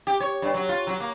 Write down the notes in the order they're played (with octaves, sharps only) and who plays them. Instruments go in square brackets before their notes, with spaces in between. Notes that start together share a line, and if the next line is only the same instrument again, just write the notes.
[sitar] G4
C#5
G2
F#3
F4
F#3
A#3